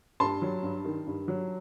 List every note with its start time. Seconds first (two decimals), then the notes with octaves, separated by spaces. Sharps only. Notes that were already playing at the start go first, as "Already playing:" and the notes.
0.20 G2 A5 C6
0.42 F#3
0.63 G2
0.85 D#3
1.07 G2
1.28 F#3